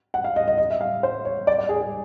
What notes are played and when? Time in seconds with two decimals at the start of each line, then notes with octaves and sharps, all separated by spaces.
0.14 F#5
0.24 F5
0.36 D#5
0.48 D#5
0.58 D#5
0.70 E5
0.81 F5
1.03 C5
1.25 C#5
1.47 D5
1.58 D5
1.69 G#4
1.81 G#4